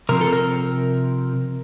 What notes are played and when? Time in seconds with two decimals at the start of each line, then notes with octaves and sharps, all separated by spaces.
0.09 C3 F3 C4 A#4
0.21 A4
0.33 A#4